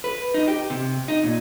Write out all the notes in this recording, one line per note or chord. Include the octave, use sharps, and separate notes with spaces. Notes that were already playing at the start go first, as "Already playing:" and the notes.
B4
D#4
G4
C3
D#4
A#2